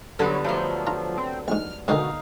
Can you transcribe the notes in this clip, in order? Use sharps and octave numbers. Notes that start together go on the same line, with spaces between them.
D3 F#3 G3 B3 A4
F3 F#3 A3
F4 A#5
C4
A#1 G#2 F6
G#2 B2 D3 D#3 D#4 F5